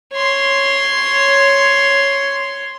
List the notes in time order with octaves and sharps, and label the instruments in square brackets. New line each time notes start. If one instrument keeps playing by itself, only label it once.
[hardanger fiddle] C#5 C6